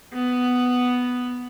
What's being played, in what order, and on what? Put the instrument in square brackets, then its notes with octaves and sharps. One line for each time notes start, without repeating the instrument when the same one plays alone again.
[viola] B3